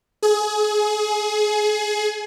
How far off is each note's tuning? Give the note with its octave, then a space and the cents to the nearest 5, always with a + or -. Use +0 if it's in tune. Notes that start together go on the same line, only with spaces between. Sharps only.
G#4 +25